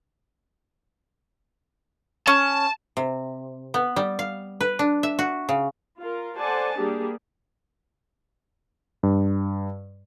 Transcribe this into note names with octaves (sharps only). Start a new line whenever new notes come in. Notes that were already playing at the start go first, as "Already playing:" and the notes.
C#4 A5
C3
B3
G3
F5
B4
D4
E5
F#4
C#3
F4 A#4
A4 C5 D5 F#5 G#5 A5
G3 A#3 D4 G4 G#4
G2